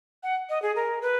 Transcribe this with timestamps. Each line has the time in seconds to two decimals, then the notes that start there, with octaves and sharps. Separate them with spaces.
0.23 F#5
0.50 D#5
0.62 G#4
0.76 A#4
1.02 B4